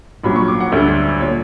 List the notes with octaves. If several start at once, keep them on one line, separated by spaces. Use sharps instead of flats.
A#1 A#2 F#3 B5
C#6
D6
F#5
D2 D3 G3 E5
A#2 G3 C#5